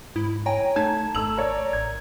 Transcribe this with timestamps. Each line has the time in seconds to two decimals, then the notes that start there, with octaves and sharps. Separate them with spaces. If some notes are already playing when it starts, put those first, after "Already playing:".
0.16 G#2 E4
0.46 C#5 G5 G#5 A#5
0.76 A3 D#4 A5 G#6
1.15 G#1 A3 A#5 E6 F#7
1.38 A#4 C#5 D5
1.73 A1 G#6